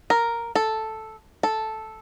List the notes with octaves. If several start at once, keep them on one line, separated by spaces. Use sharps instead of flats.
A#4
A4
A4